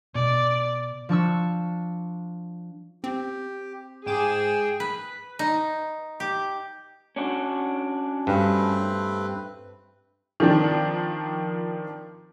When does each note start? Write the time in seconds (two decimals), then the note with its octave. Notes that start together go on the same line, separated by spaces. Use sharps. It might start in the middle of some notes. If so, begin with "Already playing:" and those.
0.15 B2 D5
1.09 F3 D4 C#6 E6
3.04 C4 G4
4.06 G#2 G#4 G5 D6 E7
4.80 B4
5.39 D#4
6.20 G4
7.16 C#4 D4 F#4
8.27 G2 A3 C4 B4
10.40 D#3 F3 C4 D4